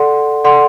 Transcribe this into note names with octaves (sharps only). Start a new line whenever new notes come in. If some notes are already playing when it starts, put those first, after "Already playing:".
Already playing: A4 D5 F#5 C6
A4 D5 F#5 C6